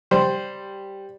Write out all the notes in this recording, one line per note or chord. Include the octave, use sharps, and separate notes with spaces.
G3 C5